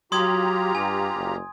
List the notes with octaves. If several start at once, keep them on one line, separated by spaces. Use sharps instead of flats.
F#3 F4 G4 A#5 C6 D#6 G#6
G2 G#5
F#1